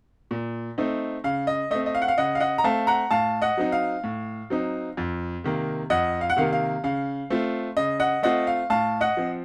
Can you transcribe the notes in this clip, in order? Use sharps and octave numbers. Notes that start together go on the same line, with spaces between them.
A#2
A3 C4 D#4
C#3 F5
D#5
A3 C4 D#5
D#5
F5
F#5
F5
C#3 D#5 F#5
F5
D#5 F#5
A#5
A3 C4 F5 A5
F#5 A#5
A2 F5 A5
D#5 F#5
F#3 C4 D#4
F5
A2
F#3 C4 D#4
F2
C3 D#3 A#3
F2 D#5 F#5
F5
F#5
C3 D#3 A#3 F5
F5
C#3 F5
A3 C4 F4
C#3 D#5
D#5 F#5
A3 C4 F4 D#5 F#5
F5
A2 F5 A5
D#5 F#5
F3 C4